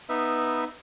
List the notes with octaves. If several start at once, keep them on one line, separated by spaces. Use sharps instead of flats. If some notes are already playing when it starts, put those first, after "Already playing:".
B3 D#4 B4 E5